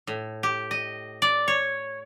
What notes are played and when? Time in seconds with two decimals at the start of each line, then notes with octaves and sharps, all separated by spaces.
0.07 A2
0.43 G4
0.71 D#5
1.22 D5
1.48 C#5